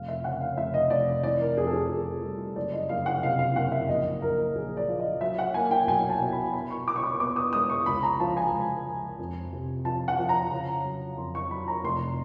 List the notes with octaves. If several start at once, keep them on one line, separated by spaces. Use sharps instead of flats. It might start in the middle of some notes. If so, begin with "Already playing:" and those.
Already playing: F1 F5
E5
C#3 F#5
F5
F1 E5
D#5
F1 D5
E3 D5
A#4
F2 G#4
A4
G#4
F2 G#4
G3
F#1 D5
D#5
F#1 F5
F#5
C3 F5
F5
F#1 F#5
E5
A#1 D#5
A#1 A#4
A#1 G#4
D5
F3
D#5
F#3 E5
F#5
A#3 G#5
G5
B1 G#5
A5
B2
B5
B3 B5
C#6
B3 D6
C#6
D6
B3 D6
D#6
G#3 D#6
C#6
C#2 B5
A#5
F3 A5
G#5
C#2
F3
F2
C3
F3 A5
F#5
F3
A#5
C#3
F#3
F2 C6
C#6
F#3 B5
A#5
F1 C6